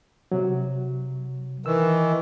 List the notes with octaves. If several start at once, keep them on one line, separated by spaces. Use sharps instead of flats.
C3 F#3
D#3 E3 E6